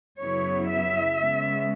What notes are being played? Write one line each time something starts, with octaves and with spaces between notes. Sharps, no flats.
F#2 C#3 F#3 B3 E4 C#5
E5
C#3 G#3 B3